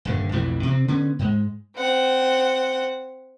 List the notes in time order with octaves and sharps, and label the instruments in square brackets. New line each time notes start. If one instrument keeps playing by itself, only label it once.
[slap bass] D#1 G2 D3
B1 F2 A2 E3
C3 C4
D3 B3 C#4
G#2 G#3
[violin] C4 F#5